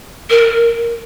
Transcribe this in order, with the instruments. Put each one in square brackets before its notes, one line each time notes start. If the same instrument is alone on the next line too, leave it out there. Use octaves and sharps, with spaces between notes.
[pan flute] A#4